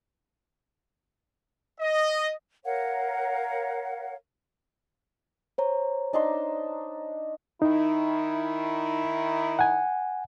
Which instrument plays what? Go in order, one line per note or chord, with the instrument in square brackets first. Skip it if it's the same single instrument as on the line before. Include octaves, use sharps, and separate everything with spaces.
[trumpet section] D#5
[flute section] A#4 C#5 F5 F#5
[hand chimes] C5 C#5 A#5
[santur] D4 D#4 C6
[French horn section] D#3 E4 [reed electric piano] D#4
[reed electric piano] F#5 G#5